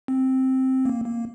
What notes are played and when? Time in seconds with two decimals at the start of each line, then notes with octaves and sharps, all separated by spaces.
0.08 C4
0.85 A#3
1.05 A#3